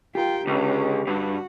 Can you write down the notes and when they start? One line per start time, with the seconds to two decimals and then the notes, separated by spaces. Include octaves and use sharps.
0.15 F4 G4 A#4 G5
0.47 C#2 D3 C#4
1.07 G2 F#4